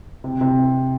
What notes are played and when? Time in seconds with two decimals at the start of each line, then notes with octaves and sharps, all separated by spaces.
0.24 C3
0.41 C3